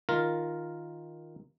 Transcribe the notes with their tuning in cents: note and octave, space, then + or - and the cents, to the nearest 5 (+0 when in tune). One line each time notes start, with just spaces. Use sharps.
D#3 +0 F4 +0 A#4 +0